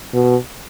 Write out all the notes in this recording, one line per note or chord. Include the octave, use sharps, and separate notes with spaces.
B2